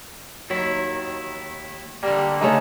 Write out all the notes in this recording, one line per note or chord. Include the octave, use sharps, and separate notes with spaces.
D#2 D#3 F#3 E4
D3 G3 A#3
C#3 A3 D#4 B4